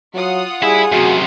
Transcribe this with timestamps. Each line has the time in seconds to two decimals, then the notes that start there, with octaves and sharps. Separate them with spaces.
0.14 F#3 F4 F#5 D#6
0.63 G3 E4 G#4
0.92 F#2 C3 F#4